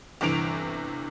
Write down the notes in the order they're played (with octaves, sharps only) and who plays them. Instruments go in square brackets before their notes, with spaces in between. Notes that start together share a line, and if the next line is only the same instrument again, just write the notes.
[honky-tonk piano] G1 G2 C3 E3 D7 F7